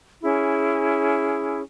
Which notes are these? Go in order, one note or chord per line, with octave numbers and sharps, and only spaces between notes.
C#4 E4 G#4